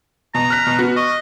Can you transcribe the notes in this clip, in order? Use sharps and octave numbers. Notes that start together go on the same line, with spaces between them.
B2 A#5
F6 F#6 B6
B2
B3 F#4
D#5 C#6